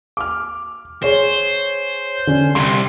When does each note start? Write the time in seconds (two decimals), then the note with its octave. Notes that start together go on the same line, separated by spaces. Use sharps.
0.17 D6 F6
1.03 G#4 C5 C#5
2.27 D3 C#4
2.55 C2 C3 C6